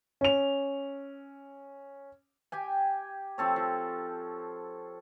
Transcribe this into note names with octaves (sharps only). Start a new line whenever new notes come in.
C#4 F7
G4 G5 G#5
F3 C4 A4 C#5
F3